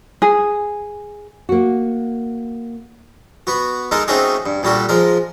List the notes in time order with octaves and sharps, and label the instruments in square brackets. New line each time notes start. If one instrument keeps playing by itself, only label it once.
[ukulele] G#4
[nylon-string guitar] A#3 F#4
[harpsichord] B3 F#4
G#3 D#4 A4 A#4
A3 C4 C#4 D#4 F#4 G#4
G2
A#2 G3 F#4 A4
F3 G#3 A#4